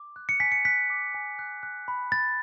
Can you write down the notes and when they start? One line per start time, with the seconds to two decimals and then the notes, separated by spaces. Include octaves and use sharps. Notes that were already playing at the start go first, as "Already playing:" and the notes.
Already playing: D6
0.16 F#6
0.29 C#7
0.40 G#5 B6
0.52 C#7
0.65 F#6 B6
0.90 D6
1.14 G#5
1.39 F#6
1.63 F#6
1.88 B5
2.12 B5 A6